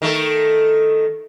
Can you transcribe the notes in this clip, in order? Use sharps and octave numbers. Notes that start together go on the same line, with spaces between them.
D#3 A3 A4